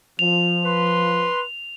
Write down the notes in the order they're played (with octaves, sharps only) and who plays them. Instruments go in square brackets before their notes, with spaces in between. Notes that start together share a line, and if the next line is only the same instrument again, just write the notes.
[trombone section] F3 [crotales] F7
[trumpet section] B4 C6